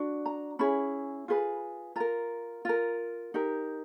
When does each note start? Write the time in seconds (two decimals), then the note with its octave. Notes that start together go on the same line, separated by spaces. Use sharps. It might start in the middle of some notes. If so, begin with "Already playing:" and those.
Already playing: D4 F#4
0.26 A#5
0.59 C#4 E4 G#4 B5
1.28 F4 G#4 B4
1.96 F4 A#4 A#5
2.65 F4 A#4
3.34 D#4 G4 A#4